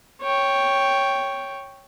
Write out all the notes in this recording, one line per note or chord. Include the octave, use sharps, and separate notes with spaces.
C#5 G5